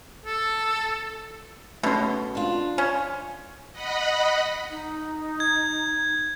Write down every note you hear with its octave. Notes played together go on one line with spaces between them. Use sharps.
A4
B2 A3 C#4 C6
D4 F4
C#4 C#5
D#5 F#5 B5
D#4
G#6